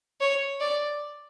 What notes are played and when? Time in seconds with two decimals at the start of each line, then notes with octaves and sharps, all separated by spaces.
0.21 C#5
0.61 D5